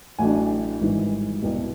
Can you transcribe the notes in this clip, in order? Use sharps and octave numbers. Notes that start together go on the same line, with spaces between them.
A1 A2 F#3 A3 D4 G#5
G#1 G#2 E3 G3
C2 B2 G3